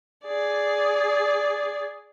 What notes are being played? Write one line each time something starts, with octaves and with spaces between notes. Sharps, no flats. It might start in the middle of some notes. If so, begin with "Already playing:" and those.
G#4 D5